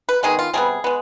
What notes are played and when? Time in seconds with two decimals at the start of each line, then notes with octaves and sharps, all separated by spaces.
0.09 B4
0.23 D#3 G#3 B3 G#4
0.39 F4
0.54 C3 G3 B3 G#4
0.84 G#3 B3